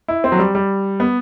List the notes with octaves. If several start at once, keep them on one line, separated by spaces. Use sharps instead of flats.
E4
C4
F#3
G3
G3
B3